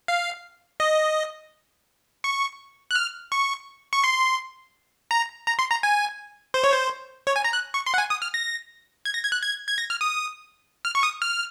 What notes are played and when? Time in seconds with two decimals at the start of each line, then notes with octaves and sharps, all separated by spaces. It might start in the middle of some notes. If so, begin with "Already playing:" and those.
0.08 F5
0.80 D#5
2.24 C#6
2.91 F#6
2.95 F6
3.32 C#6
3.93 C#6
4.04 C6
5.11 A#5
5.47 A#5
5.59 C6
5.70 A#5
5.83 G#5
6.54 C5
6.64 C#5
6.72 C5
7.27 C#5
7.36 G#5
7.44 A#5
7.53 F#6
7.74 C#6
7.86 C6
7.94 F#5
7.98 G#5
8.10 D#6
8.22 F6
8.34 A#6
9.05 G#6
9.14 A#6
9.24 G#6
9.32 F#6
9.42 G#6
9.68 G#6
9.78 A#6
9.90 F6
10.01 D#6
10.85 F6
10.95 C#6
11.03 D#6
11.22 F6